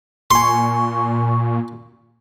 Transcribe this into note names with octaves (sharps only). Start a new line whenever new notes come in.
A#2 G#5 C6 C#6